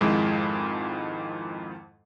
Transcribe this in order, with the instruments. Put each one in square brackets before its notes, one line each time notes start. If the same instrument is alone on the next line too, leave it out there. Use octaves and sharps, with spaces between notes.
[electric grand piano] F2 G#2 D#3 F3 G#3 E4